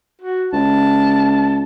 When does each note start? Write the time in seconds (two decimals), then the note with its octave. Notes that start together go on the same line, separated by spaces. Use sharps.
0.21 F#4
0.53 C#2 A5